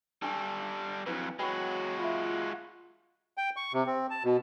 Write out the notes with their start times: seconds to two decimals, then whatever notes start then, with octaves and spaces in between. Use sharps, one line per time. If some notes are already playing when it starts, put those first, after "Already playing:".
0.22 G3 C#4 D4 A4 C#6
1.06 F2 F#3 D4 E4 B4
1.39 F#3 G#3 F#4 B4 G5 B5
1.99 F4 E5 B5
3.38 G5
3.56 C#6
3.73 C3
3.86 C4
4.10 A5
4.24 B2